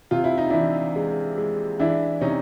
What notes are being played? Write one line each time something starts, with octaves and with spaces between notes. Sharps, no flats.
C3 F4
E4
D#4
E3 D4 E4
G#3
G#3
E3 D4 E4
C3 C#4 D#4